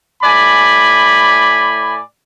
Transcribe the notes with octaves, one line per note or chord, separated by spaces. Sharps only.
A2 D5 G#5 B5